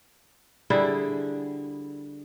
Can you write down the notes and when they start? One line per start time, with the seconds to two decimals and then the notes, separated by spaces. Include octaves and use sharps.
0.70 D3 G3 E4 G#4